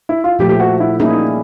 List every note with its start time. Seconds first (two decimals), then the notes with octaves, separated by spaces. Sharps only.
0.09 E4
0.24 F4
0.39 A#2 F3 A3 G4
0.49 G4
0.60 F#4
0.80 E4
1.00 G3 A#3 C#4 D#4 E4 G#4